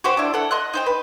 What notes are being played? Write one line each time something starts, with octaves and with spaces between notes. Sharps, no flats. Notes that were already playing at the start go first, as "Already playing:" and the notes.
F#4 G4 C5
D4 E4
A4 F#5
D#5 C6 F#6
D#4 C5 G5
B4